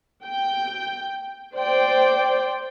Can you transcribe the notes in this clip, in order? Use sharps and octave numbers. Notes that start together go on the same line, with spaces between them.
G5
C5 D5 G5